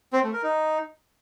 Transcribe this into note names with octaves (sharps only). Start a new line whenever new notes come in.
C4
A3
A#4
D#4